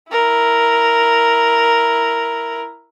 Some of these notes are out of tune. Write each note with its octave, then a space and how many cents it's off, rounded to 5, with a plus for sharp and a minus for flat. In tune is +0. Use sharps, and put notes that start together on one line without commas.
E4 +0 A#4 +0